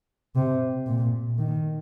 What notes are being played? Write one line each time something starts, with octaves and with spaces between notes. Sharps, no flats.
C3
A#2
D#3